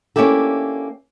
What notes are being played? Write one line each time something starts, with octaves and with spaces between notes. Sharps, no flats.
A#3 C#4 D4 E4 G4 A4